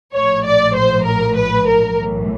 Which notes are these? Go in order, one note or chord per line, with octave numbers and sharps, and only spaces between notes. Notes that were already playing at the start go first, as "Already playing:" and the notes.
A#1 A2 F3 C#5
D5
C5
A#4
B4
A#4
B1 A2 E3